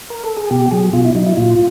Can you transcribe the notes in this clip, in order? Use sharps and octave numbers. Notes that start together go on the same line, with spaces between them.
A#4
A4
G#4
B2 G4
F#3 G#4
B2 F4
E4
F#3 D#4
E4
A#2 F4